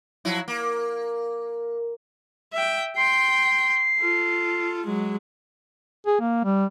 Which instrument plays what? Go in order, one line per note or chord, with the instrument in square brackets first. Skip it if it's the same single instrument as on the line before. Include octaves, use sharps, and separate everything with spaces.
[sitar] F3 F#3 E4
A#3
[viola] E5 G5
[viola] G5 C6 [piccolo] C7
[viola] F4 A4
F#3 G#3
[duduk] G#4
A#3
G3